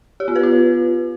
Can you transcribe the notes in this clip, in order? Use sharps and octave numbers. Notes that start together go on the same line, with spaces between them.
G4
B3
B4
F4